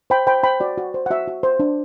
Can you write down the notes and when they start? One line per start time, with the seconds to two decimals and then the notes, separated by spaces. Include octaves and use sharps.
0.10 C5 G5 B5
0.27 C5 G5 B5
0.43 C5 G5 B5
0.60 F#4 D5
0.78 F#4
0.94 C5
1.06 F#5
1.10 F#4 E5
1.28 F#4
1.43 C5
1.60 D4